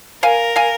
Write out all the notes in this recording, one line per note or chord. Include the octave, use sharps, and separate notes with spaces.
A#4 F5 G#5
F5 G#5